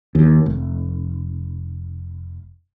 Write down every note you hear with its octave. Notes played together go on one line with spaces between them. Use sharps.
D#2
F1